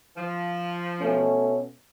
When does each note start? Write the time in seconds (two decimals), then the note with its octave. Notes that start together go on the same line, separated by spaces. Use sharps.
0.16 F3
1.01 B2 A3 C#4